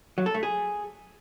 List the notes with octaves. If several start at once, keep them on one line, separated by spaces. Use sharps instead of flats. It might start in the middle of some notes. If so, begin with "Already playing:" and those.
F#3
A4
A3
G#4